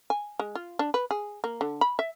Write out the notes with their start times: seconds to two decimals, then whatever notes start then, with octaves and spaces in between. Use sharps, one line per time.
0.10 G#5
0.39 G#3
0.55 F4
0.79 D4
0.94 B4
1.11 G#4
1.44 A#3
1.61 D3
1.81 B5
1.99 E5